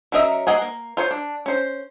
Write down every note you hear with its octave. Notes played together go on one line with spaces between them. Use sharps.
F#3 C#4 A#4 D#5 E5
A#3 G#4 D#5 F#5 G#5
A#3
F4 C5 C#5
D4
C#4 C5